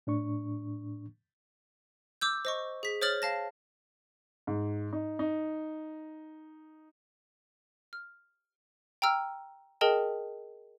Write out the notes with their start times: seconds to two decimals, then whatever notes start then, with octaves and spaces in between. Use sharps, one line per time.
0.07 A2 D4 C#6
2.21 D6 E6 G6
2.45 C5 D#5 C#6
2.83 G#4 B6
3.01 C5 C#5 D#6 F6 A6 F#7
3.22 F5 A5 A#6
4.47 G#2
4.93 D#4
5.19 D#4
7.93 F6
9.02 G5 A#5 E6 F6
9.81 G#4 A#4 D#5 G5 A5